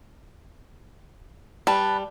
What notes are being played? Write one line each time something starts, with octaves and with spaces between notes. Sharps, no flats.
G3 B4 A5